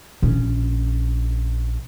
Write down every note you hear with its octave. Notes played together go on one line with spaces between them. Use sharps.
A#1 C#4